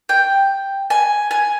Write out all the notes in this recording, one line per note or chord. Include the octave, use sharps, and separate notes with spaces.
G5
G#5
G#5